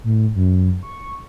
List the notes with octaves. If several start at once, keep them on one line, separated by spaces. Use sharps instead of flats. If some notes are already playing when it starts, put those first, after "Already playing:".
A2
F#2
C#6